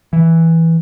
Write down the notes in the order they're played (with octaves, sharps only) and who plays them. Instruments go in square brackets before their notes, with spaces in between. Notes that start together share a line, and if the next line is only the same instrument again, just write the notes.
[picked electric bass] E3